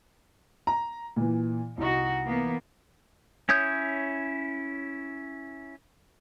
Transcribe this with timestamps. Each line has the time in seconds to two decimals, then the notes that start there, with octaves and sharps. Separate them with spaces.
0.67 A#5
1.16 A#2 E3
1.78 C2 D#4 F#4
2.27 E3 A#3 B3
3.49 C#4 E4 C#5 D#6 G6